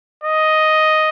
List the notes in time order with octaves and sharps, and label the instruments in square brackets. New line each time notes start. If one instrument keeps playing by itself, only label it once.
[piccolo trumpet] D#5